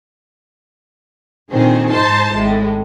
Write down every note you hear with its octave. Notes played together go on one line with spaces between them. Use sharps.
A#2 D3 D#3 C4 G#4
G#2 D#4 C5 A5 C6
G#1 A2 G#3